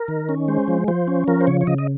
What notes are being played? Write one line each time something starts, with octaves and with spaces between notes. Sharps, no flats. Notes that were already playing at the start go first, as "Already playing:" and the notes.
Already playing: A#4
D#3
C#4
G#3 C5
F3
F3 C5
C#4
F3 A#4
C5
C#3 C#5
C#5
C#3 D#5
D#5